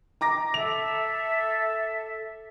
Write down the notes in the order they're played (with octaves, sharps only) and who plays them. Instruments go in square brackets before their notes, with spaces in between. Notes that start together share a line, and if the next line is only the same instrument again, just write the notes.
[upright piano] A#5 D6 A#6
[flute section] A4 E5 [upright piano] F7